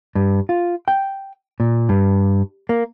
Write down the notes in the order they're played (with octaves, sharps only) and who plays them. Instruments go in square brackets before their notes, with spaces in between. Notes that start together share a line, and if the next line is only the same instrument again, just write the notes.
[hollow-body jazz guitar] G2
F4
G5
A#2
G2
A#3